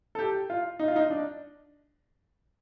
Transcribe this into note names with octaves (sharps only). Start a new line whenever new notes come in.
A4
G4
F4
D#4
F4
D#4
D4